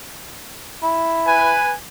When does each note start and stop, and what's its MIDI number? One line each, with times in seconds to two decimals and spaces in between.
0.83 1.56 64
1.26 1.75 71
1.26 1.75 80